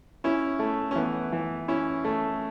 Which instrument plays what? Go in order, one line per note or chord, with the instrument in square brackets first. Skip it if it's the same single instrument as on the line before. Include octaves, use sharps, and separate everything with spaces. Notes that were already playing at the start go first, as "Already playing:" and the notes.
[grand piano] C#4 [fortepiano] E4
[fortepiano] A3
[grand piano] C#4
[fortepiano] E3 [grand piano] B3
[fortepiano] E3
[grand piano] C#4 [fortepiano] E4
[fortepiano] A3